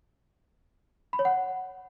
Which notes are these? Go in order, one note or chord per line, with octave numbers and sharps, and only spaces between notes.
B5
C#5
F#5